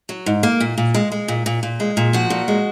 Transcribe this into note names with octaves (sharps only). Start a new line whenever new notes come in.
F#3
G#2
A#3
A#2
A#2
G#3
G#3
A#2
A#2
A#2
G#3
A#2
F3 F#4
A#2
G#3